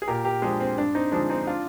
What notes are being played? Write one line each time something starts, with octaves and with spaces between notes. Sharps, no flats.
G#4
A#2 G4 A#4
G4 A#4
F3 G#3 D4
C4
G2 D4
C4 D#4
D3 F3 G#3 D4
C4 D#4
D4 F4